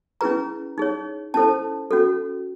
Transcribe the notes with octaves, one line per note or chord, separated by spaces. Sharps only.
C#4 E4 G#4 B4 A#5
D#4 G#4 C#5
C#4 E4 A4 C5 A5
C#4 F#4 A4